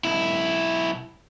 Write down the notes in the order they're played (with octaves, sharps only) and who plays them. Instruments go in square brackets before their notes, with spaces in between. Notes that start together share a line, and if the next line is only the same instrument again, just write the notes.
[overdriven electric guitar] B1 E4